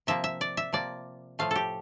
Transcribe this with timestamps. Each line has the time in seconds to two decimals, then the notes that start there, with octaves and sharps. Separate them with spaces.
0.07 C3 F3 A#3 E5
0.24 E5
0.41 D5
0.57 E5
0.73 C3 F3 A#3 D5
1.39 A2 F3 A3 F5
1.51 G4 A4